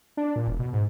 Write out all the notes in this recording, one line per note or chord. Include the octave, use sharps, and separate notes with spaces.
D4
A#2
E1
B2
G#2